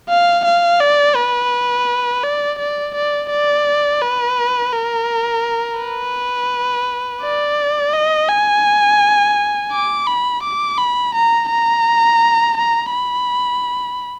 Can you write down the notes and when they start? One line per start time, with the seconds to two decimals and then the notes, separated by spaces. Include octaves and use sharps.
0.10 F5
0.45 F5
0.81 D5
1.16 B4
2.24 D5
2.59 D5
2.95 D5
3.30 D5
4.02 B4
4.73 A#4
5.79 B4
7.22 D5
7.93 D#5
8.28 G#5
9.72 D6
10.07 B5
10.43 D6
10.78 B5
11.14 A#5
11.50 A#5
12.57 A#5
12.92 B5